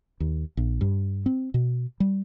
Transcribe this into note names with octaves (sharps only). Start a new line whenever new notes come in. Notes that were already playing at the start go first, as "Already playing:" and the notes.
D#2
A#1
G2
C4
B2
G3